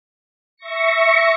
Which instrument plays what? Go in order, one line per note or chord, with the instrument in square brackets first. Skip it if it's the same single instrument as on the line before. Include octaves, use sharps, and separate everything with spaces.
[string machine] E5 C#6 A#6 C#7